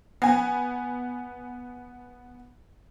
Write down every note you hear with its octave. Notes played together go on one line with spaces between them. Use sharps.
B3 G#5